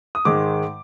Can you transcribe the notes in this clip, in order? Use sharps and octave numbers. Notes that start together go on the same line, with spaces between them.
D#6
G#2 D#3 G#3 D6